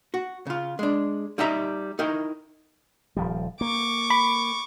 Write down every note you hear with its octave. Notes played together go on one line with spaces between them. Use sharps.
F#4
C#3 F4
G#3 D4
G3 D#4 G4 E5 A#5
D#4 E4 A#4 G5
D#1 F3 G3
A#3 C#6 D6
B5